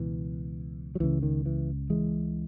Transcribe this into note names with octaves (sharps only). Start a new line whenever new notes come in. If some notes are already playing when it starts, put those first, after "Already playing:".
Already playing: C#2 B2 E3
F#3
C#2 C#3 E3
D#3
E3
E3 G#3